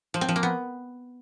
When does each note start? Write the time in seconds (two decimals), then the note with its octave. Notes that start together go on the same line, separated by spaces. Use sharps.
0.14 F3
0.21 C4
0.29 F3
0.36 A#3
0.43 B3